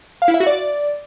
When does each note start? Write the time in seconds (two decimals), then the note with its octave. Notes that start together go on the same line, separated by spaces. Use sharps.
0.22 F5
0.28 E4
0.34 E5
0.40 F#4
0.47 D5